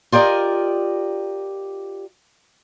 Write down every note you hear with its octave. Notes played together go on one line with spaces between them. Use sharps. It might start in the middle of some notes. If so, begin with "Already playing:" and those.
F4 G4 A#4 D5 D#5